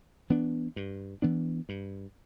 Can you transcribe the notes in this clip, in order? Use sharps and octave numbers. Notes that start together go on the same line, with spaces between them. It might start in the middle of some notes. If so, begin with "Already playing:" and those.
E3 B3 D4
G2
E3 B3 D4
G2